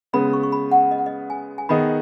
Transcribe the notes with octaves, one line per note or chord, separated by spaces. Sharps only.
C#3 G#3 B3 B5
C#6
C#6
B5
F#5
D#5
F#5
D#5
G#5
G#5
D#3 B3 G#4 D#5 B5